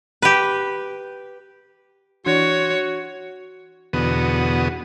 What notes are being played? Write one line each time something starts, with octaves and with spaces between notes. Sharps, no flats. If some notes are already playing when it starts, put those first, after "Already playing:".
G4 B4
E3 D4 F#4 C#5 C6
E2 B2 D3 B3 F#4 D#6